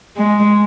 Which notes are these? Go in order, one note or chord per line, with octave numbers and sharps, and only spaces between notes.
G#3